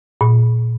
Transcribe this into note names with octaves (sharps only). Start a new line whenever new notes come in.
A#2